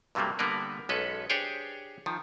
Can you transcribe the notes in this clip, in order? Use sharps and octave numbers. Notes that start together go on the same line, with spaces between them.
G2 C3 F#3 G3 A3 A#3
D3 G3 A#3 B3 A#4 B4
B1 G#3 C#4 A4 B4
D4 G4 G#4 C5 C#5 G5
D#3 F3